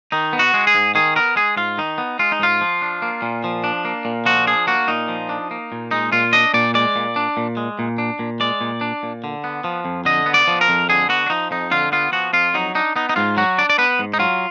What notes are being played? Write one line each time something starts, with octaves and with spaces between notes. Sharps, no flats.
D#3 D#4
B3
F#4
G#3
G#4
G#2
D#3 G#4
B3 A#4
G#3 G#4
G#2 F4
D#3 D#4
B3
G#3 F4
D#4
G#2 F4
F3
D4
A#3
A#2
F3
D4
A#3
A#2
F3 F#4
D4 G#4
A#3 F#4
A#2 D#4
F3
D4
A#3
A#2
G#3 D#4
A#2 F4
D4 D#5
A#2 D5
G#3 D5
A#2
D4
A#2
G#3
A#2
D4
A#2
G#3 D5
A#2
D4
A#2
D3
B3
F3
F2
D3 D#5
B3
D5
F3
A#4
F2
D3 G#4
B3 F#4
D4
F3 D#4
F2 D#4
D3 F4
B3 F4
F3 F#4
F2 F4
F#3 D#4
D4 D#4
B3 D#4
D#4
G#2 F4
F#3 F#4
D4 D5
D5
B3 B4
G#2
D#4
F#3 F4